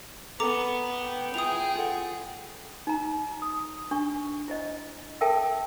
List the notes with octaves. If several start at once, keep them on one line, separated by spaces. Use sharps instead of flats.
B3 A4 G#5 A#5 D6
G5
E4 F4 G#4 B4 D#6 F7
F4 A4 F#5
D#4 A#5
D#6
D4 C#6
E4 C5 D#5
A4 A#4 E5 G5 A5 E6